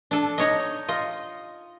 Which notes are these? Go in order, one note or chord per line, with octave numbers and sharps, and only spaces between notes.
D4 A4
D#4 C#5 D#5
F4 D#5